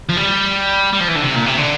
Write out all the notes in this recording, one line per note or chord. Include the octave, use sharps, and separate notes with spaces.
F3
G3
G3
F3
E3
D3
C3
A#2
C3
D3